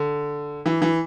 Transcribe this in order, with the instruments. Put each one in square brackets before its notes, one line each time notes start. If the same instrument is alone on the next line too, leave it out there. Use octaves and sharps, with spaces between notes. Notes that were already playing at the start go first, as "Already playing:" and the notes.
Already playing: [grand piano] D3
E3
E3